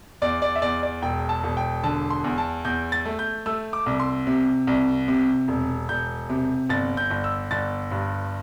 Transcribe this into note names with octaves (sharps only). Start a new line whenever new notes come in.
E2 D5
D5
E5
E2 D5
D5
E1 G5
A5
E1
G5
D3 A5
C6
E2
A5
E2 G6
A6
A3
G6
A3 E6
D6
C2
C6
C3
C2
C3
E1
E1 G6
C3
G1 A6
G6
G1
E6
G1 A6
G2